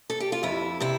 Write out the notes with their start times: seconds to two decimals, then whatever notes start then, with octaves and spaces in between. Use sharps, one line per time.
0.10 A4
0.20 G4
0.32 F4
0.43 F2 E4
0.80 C3 E4